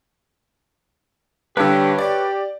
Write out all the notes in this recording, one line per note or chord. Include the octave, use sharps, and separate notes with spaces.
G2 D3 G4 B4 C#5 E6
G4 D5